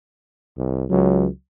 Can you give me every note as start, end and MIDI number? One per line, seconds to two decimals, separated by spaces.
0.58 0.85 36
0.90 1.27 37
0.90 1.28 54